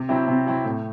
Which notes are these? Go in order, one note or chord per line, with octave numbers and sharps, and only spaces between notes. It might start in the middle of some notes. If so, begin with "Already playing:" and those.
Already playing: C3
F#3 C4 E4 G4
C3
F#3 C4 E4 G4
A2